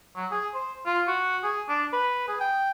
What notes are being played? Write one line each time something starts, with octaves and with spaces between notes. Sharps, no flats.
F#3
G#4
C5
F4
F#4
G#4
D4
B4
G#4
G5